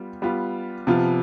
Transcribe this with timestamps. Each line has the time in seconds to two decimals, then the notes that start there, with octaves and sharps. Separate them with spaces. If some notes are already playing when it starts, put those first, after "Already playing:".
Already playing: G3 B3 F4
0.22 G3 B3 F4
0.87 C3 F3 B3 F4